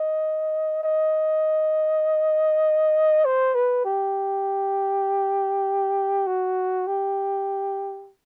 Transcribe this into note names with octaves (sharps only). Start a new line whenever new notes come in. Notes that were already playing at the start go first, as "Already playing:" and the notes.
Already playing: D#5
D#5
C5
B4
G4
F#4
G4